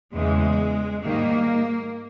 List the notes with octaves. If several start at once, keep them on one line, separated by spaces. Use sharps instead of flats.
E2 C#3 E3 G#3
G#2 D#3 G3 A#3